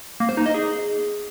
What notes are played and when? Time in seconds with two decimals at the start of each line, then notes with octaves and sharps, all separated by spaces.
0.20 A#3
0.29 C5
0.37 D#4
0.46 D#5
0.54 G#4